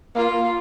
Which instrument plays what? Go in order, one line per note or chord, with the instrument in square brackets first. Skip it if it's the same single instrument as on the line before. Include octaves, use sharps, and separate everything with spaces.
[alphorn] A#3 [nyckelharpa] F4